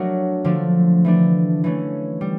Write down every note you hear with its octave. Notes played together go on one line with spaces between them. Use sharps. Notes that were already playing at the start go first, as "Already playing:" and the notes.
Already playing: F#3 A3 D4 F#4 A#4
D3 F3 A3 D4
E3 A3 D4
E3 A3 C#4
G3